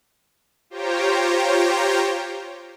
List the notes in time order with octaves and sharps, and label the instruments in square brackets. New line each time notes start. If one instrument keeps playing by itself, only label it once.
[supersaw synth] F4 G4 C5 C#5 G5 A#5